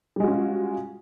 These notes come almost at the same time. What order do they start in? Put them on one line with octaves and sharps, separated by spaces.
G3 G#3 F#4 C#4 F4